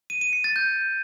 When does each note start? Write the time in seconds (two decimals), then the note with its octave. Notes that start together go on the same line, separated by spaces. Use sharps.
0.10 D#7
0.21 D#7
0.33 C#7
0.44 A6
0.56 G6